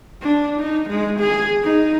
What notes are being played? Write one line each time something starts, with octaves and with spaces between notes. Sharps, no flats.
D4
D#4
G#3
G#4
D#4